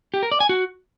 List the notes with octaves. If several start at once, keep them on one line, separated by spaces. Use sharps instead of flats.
G4
A#4
D5
G#5
F#4